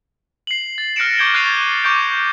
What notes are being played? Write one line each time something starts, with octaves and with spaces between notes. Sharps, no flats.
C7 F#7
A6
F6 F#6 A#6 C#7 D7 E7
C#6 D6 G6 G#6 D7 G7
C#6 F#6 A6 C7 D#7 F7
C#6 D6 G6 D7